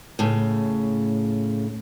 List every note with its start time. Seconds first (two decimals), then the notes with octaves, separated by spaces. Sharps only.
0.19 A2 C#3